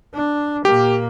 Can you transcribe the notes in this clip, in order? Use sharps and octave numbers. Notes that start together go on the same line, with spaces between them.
D4
A#2 A#3 G4